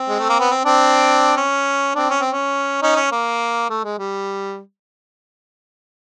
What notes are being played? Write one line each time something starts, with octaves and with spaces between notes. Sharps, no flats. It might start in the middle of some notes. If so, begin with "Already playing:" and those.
Already playing: C4
G#3
A3
A#3
B3
C4
C4 D4
C#4
C4 D4
C#4
C4
C#4
C#4 D#4
C#4
A#3
A3
G#3
G3